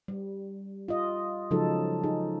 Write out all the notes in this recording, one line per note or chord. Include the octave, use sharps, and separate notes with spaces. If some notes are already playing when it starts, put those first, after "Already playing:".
G3
F4 D#5
C#3 F3 F#3 G#3 D#4 A4
D#4 G#4